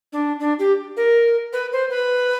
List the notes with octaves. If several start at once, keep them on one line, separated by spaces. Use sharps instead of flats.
D4
D4
G4
A#4
B4
C5
B4